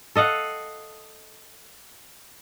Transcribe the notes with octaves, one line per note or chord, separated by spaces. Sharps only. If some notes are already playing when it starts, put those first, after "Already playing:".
A4 D#5 F5 F#5